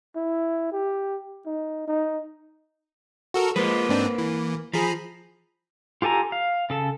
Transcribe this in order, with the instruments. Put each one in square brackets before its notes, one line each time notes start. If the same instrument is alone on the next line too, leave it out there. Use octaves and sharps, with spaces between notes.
[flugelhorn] E4
G4
D#4
D#4
[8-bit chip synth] F#4 A4 A#4
[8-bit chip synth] F3 G#3 [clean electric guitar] A#3 B4
[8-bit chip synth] G#2 C4 D4
E3
[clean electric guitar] F3 [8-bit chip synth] G#4 A#5 B5
[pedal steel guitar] F4 G4 A4 G#5 A#5
F5
C#3 A4 A5